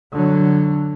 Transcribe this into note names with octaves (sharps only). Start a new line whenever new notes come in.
D3 F#3